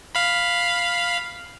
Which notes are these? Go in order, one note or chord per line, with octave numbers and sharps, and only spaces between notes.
F5 B5